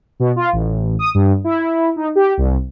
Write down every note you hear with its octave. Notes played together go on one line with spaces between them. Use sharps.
B2
F4
A1
D#6
G2
E4
D#4
G4
C2